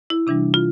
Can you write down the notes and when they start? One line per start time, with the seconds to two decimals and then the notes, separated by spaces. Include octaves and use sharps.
0.10 E4
0.27 C3 E3 G3 D4
0.54 F4